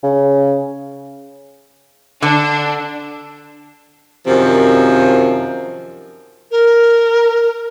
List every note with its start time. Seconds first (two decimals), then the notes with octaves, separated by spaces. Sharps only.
0.04 C#3
2.22 D3 D4
4.26 F#2 C3 D#3 F3
6.51 A#4